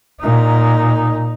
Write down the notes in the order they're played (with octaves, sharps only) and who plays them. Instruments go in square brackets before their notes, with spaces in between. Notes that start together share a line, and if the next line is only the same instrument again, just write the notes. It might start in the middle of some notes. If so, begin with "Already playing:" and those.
[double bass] A#2 D#4